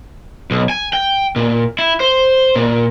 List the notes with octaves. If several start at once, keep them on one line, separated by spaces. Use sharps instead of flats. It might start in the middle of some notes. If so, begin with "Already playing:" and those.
B1
G#5
G5
A#2
E4
C5
A#2